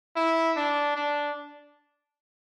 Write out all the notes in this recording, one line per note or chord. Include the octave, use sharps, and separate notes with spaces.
E4
D4
D4